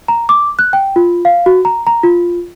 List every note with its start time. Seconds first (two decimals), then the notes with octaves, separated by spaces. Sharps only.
0.08 A#5
0.29 D6
0.59 F#6
0.73 G5
0.96 F4
1.25 F5
1.46 F#4
1.65 A#5
1.87 A#5
2.03 F4